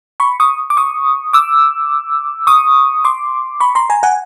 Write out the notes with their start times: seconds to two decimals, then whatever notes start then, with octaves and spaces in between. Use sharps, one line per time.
0.20 B5 C#6
0.40 C#6 D#6
0.70 D6
0.77 C#6 D#6
1.33 D6 E6
2.47 C#6 D#6
3.04 C6 D6
3.60 B5 C#6
3.75 A#5 C6
3.90 G#5 A#5
4.03 F#5 G#5